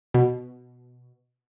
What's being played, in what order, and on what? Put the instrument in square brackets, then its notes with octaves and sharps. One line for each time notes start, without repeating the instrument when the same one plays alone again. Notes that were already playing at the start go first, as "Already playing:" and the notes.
[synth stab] B2